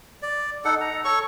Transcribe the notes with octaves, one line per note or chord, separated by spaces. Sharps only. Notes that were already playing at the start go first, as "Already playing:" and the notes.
D5
D#4 A4 F#5
A#5
A4 C#5 C#6